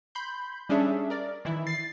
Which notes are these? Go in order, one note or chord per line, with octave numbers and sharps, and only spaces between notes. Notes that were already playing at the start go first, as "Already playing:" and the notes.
B5 C6 G6
G3 C#4 D4 G#4 E5
A#4 D5
D#3 E3 E4
A6 C7